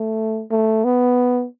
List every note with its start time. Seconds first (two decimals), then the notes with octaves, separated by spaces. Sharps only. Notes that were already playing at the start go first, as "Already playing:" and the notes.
Already playing: A3
0.51 A3
0.84 B3